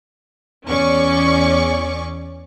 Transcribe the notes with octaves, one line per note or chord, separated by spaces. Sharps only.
E2 C#4 G#4 D5 C#6 D6